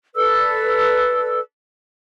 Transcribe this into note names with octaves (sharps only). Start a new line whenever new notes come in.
A4 B4 D5 E6